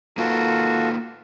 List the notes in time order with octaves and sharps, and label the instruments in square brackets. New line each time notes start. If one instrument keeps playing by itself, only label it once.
[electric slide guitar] A#3 D#4 B4 [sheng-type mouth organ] F4 F#4 A4